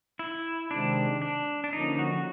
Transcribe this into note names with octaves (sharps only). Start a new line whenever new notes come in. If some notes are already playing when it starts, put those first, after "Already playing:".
E4
C3 D#3 G#3 C4 D4
D4
D4
D3 F3 A#3 C#4 D#4
F#4